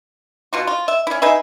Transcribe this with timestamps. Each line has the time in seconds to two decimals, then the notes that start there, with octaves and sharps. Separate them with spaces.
0.53 B2 F4 F#4
0.67 F4
0.88 E5
1.07 C#4 E4
1.22 D#4 G#4 B4 E5